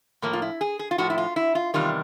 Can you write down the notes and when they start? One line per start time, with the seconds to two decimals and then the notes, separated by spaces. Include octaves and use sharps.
0.22 A2 F3 A#3
0.33 F4
0.42 E4
0.61 G#4
0.79 G#4
0.91 F4
0.98 A2 F3 F#4
1.10 E4
1.18 F4
1.36 E4
1.55 F4
1.74 E2 C3 D#3 G3 F4